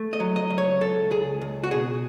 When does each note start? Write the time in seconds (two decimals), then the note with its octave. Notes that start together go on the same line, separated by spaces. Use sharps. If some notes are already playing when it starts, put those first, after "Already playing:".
Already playing: A3
0.13 D#5
0.20 F#3
0.36 D#5
0.50 C#2
0.58 C#5
0.81 C#2 A4
1.11 C#2 G#4
1.41 C#2
1.64 F#4
1.71 B2 G#4